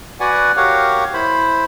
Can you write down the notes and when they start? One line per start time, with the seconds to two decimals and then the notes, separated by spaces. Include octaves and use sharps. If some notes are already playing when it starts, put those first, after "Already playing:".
0.20 F#4 B4 D5 F#5 G#5
0.57 F#4 G4 A#4 C#5 F5 F#5
1.14 E4 C5 B5